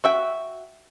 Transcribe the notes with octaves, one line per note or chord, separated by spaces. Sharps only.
F#4 E5 G5